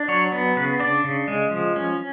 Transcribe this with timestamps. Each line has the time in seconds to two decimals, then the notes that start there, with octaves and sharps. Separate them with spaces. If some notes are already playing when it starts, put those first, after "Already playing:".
Already playing: D4
0.08 F#3 C#5
0.32 B3
0.56 C#3 B4
0.80 D4 D5
1.04 C#3
1.28 G#3
1.51 F3
1.76 C#4